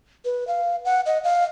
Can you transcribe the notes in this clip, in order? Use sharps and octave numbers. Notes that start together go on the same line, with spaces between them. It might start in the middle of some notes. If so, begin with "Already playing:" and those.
B4
F5
F#5
D#5
F5